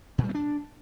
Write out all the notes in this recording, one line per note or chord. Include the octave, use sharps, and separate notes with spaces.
A#2
G3
B3
D4